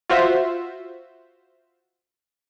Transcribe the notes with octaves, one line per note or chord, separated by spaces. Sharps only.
F4 F#4 C5 E5